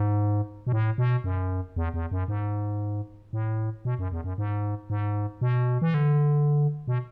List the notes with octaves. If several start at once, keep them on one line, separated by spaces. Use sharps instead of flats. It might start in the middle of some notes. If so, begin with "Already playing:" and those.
Already playing: G#2
B2
A2
B2
F#2
E2
E2
F#2
G#2
A2
B2
F#2
E2
F#2
G#2
G#2
B2
E3
D3
B2